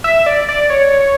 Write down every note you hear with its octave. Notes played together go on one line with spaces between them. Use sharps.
E5
D5
D5
C#5